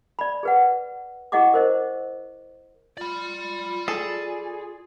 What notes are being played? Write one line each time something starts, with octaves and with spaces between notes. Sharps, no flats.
D5 B5
G#4 B4 F#5
E4 G#4 D#5 F#5 C#6 D6
A#4 C5 D#5
F4 D5 B5
G#4 A4